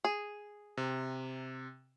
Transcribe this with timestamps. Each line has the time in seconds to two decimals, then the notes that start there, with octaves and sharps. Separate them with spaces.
0.04 G#4
0.77 C3